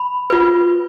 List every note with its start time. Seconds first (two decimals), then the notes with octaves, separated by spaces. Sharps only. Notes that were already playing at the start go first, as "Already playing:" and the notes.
Already playing: B5
0.30 F4 B4